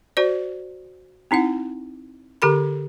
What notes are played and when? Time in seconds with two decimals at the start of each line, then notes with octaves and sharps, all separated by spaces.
0.17 F#4 C5 D5
1.31 C4 D#4 E4 F#5
2.42 D3 G4 A#4 B5